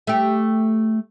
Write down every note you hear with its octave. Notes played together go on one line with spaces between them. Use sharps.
A3 G4